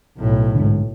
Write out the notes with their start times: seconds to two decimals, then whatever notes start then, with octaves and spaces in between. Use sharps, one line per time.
0.18 B1 A2
0.55 G#2 D3